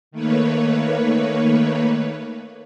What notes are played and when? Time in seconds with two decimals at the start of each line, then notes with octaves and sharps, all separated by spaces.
0.11 D#3 A3 A#3 B4 C#5